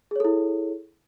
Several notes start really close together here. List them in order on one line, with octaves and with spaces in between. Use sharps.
G#4 C#5 A4 E4